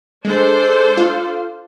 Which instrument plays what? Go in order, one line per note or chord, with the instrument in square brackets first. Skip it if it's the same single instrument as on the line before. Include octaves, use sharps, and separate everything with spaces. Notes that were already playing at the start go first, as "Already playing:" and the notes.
[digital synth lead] G#3 [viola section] D4 A4 C5
[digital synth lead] F4